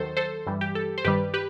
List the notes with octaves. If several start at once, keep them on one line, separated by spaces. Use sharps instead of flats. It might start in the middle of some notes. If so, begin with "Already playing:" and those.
Already playing: D#2 D#3 F#3 A4 C5
A4 C5
G2 E3 G3
G4
A4
C5
G2 D#3 G3 G4 B4
G4 B4